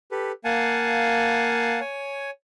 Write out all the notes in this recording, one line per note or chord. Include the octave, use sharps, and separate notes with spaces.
G4 A4 B4
A#3 F5 F#5 G#5 A5
C#5 G#5